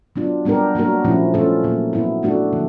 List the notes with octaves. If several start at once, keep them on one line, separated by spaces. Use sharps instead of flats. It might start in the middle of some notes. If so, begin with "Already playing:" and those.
F#3 B3 D4 F4
G3 B3 D4 G4 A#4
F#3 A#3 D4 F#4 A#4
A#2 F3 A3 C#4 E4
A3 C#4 F4 A4
A#2 F#3 A#3
F#3 B3 E4
A3 D4 F#4 A4
D3 F3 A#3